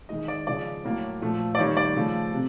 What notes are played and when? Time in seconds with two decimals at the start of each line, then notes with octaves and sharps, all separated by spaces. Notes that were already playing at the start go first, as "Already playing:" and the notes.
0.09 D#3 G#3 D#5
0.28 D5
0.47 C#3 F3 G#3 D5
0.85 A2 F#3 A#3
1.21 A#2 F3 A3
1.55 D5
1.59 D#3 G3 A#3 C#5
1.77 D5
1.96 C#3 F3 A3
2.33 C3